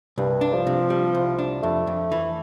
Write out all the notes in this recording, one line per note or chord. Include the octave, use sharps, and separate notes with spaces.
C2 G2
D4
F3
C3
G3
C2
D4
F2 A3
F2
E3